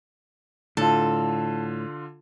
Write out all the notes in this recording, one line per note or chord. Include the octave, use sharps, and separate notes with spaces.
A2 D3 F4 A4